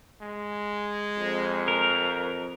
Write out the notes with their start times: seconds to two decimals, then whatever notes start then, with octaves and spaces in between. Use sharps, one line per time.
0.22 G#3
1.18 F2
1.68 A#4